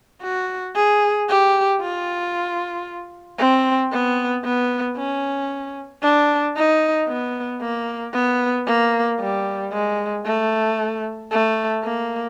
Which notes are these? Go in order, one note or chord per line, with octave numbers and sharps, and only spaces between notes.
F#4
G#4
G4
F4
C4
B3
B3
C#4
D4
D#4
B3
A#3
B3
A#3
G3
G#3
A3
A3
A#3